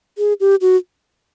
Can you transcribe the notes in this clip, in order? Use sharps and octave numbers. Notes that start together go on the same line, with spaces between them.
G#4
G4
F#4